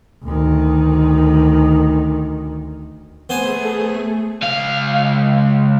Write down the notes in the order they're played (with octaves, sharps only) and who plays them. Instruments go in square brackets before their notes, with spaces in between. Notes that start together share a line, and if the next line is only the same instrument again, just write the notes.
[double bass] D2 D#3
[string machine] A3 G#4 [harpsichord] B3 C5 G#5
[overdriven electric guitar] C#2 F5